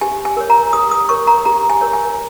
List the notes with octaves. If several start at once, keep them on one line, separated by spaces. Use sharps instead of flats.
G4 G#5
G#5
A#4 C#5
A#5
G4 D#6
D#6
A#4 C#5 C#6
A#5
G4 A#5
G#5
A#4 C#5
G#5